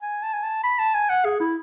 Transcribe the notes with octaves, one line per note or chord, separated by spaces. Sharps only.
G#5
A5
G#5
A5
B5
A5
G#5
F#5
G#4
E4